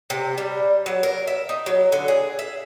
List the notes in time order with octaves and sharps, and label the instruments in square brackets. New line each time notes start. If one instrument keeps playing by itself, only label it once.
[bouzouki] C3
G3
F#3
A#4
E5
D#4
F#3
D3
G#4
E5